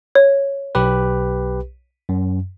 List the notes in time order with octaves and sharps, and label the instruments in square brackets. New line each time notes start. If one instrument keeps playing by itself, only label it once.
[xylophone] C#5
[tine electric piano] B1 G4 B4
F#2